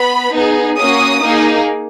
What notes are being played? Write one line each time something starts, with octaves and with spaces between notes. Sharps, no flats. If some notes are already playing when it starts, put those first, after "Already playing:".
Already playing: B3 B5
B3 D#4 G#4
A#3 C#4 F#4 D#6
A#3 D#4 G#4